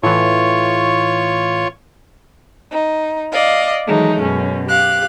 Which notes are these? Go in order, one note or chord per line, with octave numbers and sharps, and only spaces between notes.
A2 E3 F4 C#5 C#6
D#4
D5 D#5 F5
D#3 E3 F#3 G#3 A3 D#4
F#2 B2 C#4
G4 F5 F#6